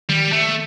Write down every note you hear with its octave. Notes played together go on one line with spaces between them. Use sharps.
D#3 G3
A3